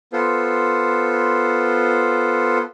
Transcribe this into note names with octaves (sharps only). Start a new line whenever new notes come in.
B3 F4 A4 C5